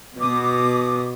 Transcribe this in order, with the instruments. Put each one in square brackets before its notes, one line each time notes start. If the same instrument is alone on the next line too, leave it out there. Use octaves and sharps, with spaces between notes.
[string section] B2 [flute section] D6 D#6